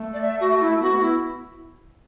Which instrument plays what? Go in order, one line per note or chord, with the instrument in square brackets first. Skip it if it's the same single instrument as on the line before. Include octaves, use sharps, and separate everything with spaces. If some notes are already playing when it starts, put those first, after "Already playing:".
Already playing: [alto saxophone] A3
[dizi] D5
E5
F#4
E4
[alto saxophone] B3 [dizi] F#4
[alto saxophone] B3 [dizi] E4